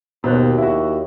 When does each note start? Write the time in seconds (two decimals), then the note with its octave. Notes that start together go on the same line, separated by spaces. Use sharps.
0.24 D#2 B2 C5 F#6
0.58 E4 F#4